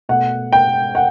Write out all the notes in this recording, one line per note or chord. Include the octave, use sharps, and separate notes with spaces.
B2 A3 F#5
G5
F#5